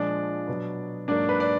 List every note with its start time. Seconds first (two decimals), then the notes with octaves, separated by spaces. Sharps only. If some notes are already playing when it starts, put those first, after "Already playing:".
Already playing: A#2 F3 G#3 D4 D5
0.47 B2 F#3 B3
1.08 G#2 F#3 A#3 D4 D5
1.29 B4
1.40 D5